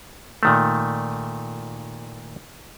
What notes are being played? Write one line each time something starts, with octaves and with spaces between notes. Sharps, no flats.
A#2 D#3 A3